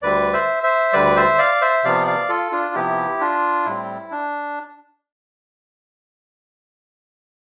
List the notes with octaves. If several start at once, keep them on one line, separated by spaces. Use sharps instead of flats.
D2 D3 G3 B4 D5
C5 E5
C5 E5
D2 D3 G3 B4 D5
C5 E5
D5 F5
C5 E5
C3 F3 B3 D5 F5
D5 F5
F4 A4
D4 F4
C3 F3 B3 E4 G4
D4 F4
A2 G3 C4 E4
D4